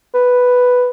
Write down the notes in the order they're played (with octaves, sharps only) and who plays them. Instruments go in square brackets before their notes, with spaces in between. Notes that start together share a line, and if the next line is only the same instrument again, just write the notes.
[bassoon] B4